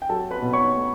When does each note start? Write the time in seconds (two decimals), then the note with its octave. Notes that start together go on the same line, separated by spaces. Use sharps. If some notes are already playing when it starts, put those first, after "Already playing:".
0.02 G5
0.09 F#3 A4 A5
0.31 B4 B5
0.42 B2
0.53 C#5 C#6
0.76 A3